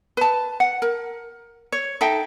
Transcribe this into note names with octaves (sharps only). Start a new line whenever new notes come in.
B4 A5
F#5
A#4
C#5
D#4 A4 E5 G5